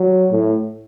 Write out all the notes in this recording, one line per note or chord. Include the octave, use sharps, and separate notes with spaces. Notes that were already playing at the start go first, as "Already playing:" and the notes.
Already playing: F#3
A2